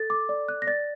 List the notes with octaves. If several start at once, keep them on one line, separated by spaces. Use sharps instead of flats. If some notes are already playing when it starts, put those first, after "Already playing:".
Already playing: A4 A6
D6
D5
F#6
A#6
D5 A6